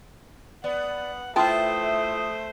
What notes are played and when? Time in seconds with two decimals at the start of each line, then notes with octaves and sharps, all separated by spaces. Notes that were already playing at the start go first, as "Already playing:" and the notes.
0.64 B3 D5 F#5
1.36 A3 E4 F4 B4 C5 G5 A5 D#6